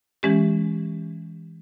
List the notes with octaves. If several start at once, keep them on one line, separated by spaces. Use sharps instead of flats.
E3 G#3 C#4 G4